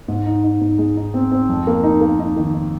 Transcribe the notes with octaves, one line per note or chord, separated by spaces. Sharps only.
G#2
D#4
D#4
G#2
G#3
D#4
C4
C4
F2
A#3
D#4
A#3
D#4
D#3
D#4